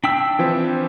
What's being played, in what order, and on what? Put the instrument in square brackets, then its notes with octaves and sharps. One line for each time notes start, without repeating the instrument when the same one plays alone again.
[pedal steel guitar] D4 G5 E6 [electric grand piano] B6
[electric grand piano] E3 F3 C4